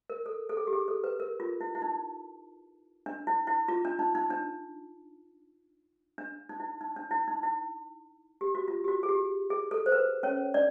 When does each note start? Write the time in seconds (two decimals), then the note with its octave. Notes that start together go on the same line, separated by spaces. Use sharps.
0.10 A#4
0.26 A4
0.49 A4
0.57 G#4
0.67 G4
0.73 G#4
0.88 A4
1.04 B4
1.20 A#4
1.40 F4
1.61 E4
1.75 E4
1.82 D#4
3.06 D4
3.27 E4
3.47 E4
3.68 F4
3.85 D4
3.99 D#4
4.15 D#4
4.30 D4
6.18 D4
6.49 D#4
6.60 E4
6.81 D#4
6.96 D4
7.11 E4
7.28 D#4
7.43 E4
8.41 G4
8.55 F#4
8.68 F4
8.84 G4
8.88 F#4
9.03 G#4
9.09 G4
9.50 G#4
9.71 A4
9.86 C5
9.92 B4
10.23 C#4 C#5
10.54 D4 D5